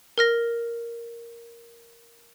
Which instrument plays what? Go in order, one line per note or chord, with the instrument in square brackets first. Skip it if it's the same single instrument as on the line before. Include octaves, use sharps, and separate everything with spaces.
[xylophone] A#4 F6 A#6